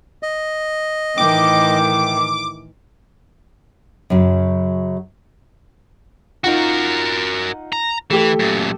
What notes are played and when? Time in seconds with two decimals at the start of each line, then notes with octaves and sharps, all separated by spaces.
0.23 D#5
1.18 A2 D#3 E3 G5 D6
4.10 F#2 C#3 F#3
6.44 D#4 F4 F#4 A#4 F#5
7.72 A#5
8.10 E3 A3 G4 A4
8.39 F#2 A#2